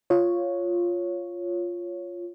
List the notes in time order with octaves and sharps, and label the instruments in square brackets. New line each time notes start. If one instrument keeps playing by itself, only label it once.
[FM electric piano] F4 C#5